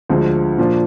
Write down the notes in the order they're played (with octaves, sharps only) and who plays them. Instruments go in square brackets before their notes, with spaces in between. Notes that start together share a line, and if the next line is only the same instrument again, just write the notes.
[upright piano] D2 D3 F3 G#3
A#2 F3 A#3 D4 F4